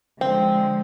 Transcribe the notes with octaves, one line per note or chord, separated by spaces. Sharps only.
D3 F3 G#3 C4